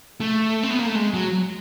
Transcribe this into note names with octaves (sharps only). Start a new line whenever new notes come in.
A3
C4
B3
A#3
A3
G#3
F#3